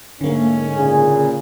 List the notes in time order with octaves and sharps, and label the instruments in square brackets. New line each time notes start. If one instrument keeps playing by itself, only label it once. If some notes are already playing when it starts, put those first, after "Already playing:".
[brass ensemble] G#2 A3 C#4 [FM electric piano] D3 A#3
[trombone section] A#2 C#3 G#4